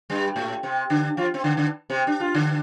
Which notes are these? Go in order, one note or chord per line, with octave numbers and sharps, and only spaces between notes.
G2 G3
A2 A3
C3 C4
D3 D4
F3 F4
C4
D3 D4
D3 D4
C3 C4
D4
F4
D3 D4